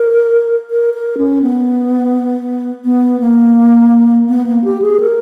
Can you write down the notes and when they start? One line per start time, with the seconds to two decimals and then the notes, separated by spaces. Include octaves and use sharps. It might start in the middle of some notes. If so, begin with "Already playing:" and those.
Already playing: A#4
0.71 A#4
0.94 A#4
1.18 C#4
1.42 B3
2.85 B3
3.20 A#3
4.29 B3
4.46 A#3
4.64 G4
4.82 G#4
5.00 A#4